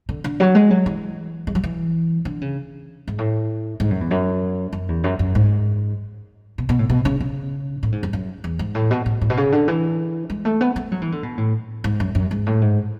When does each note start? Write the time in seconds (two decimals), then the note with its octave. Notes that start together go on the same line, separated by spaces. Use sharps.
0.09 D3
0.24 D3
0.40 F#3
0.55 G#3
0.71 F#3
0.86 E3
1.47 G#3
1.55 F#3
1.64 E3
2.25 D3
2.41 C#3
3.08 G#2
3.18 A2
3.80 G#2
3.90 F#2
4.01 E2
4.11 F#2
4.73 F#2
4.88 E2
5.04 F#2
5.19 F#2
5.35 G#2
6.58 B2
6.69 B2
6.79 A2
6.90 B2
7.05 C#3
7.20 C#3
7.83 A2
7.92 G#2
8.03 F#2
8.13 F#2
8.44 E2
8.59 G#2
8.75 A2
8.91 B2
9.06 A2
9.21 A2
9.30 B2
9.37 C#3
9.52 D3
9.68 E3
10.30 G#3
10.45 A3
10.61 B3
10.76 A3
10.92 F#3
11.02 E3
11.12 D3
11.23 B2
11.38 A2
11.84 G#2
12.00 F#2
12.15 F#2
12.31 G#2
12.46 A2
12.61 G#2